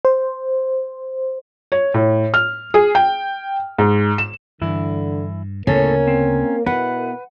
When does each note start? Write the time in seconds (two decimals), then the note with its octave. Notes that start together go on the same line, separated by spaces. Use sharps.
0.05 C5
1.72 C#5
1.94 A2
2.34 F6
2.74 G#4
2.95 G5
3.78 G#2
4.18 E7
4.61 G2 D3 E3 E4
5.67 D2 A2 C#3 A#3 B3 C#4 A4 A#4
6.08 C4
6.66 B2 B3 E4 A#4 B4 F#5